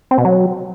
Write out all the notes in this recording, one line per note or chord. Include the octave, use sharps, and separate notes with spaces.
C4
B2
F#3